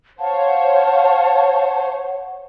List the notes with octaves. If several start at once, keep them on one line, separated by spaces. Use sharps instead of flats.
C5 C#5 F5 F#5 A5